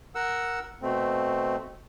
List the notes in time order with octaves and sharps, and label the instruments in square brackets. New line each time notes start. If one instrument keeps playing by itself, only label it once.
[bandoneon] A#4 F#5 E6
B2 A3 C4